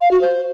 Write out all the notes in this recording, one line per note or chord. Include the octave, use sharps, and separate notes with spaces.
F5
F#4
C5